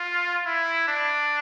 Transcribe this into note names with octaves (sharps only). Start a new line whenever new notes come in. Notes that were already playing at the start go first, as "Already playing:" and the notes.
Already playing: F4
E4
D4